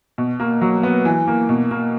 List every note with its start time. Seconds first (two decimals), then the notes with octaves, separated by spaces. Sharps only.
0.18 B2
0.40 A#3
0.61 F#3
0.83 B3
1.05 E3
1.28 A#3
1.49 B2
1.71 A#3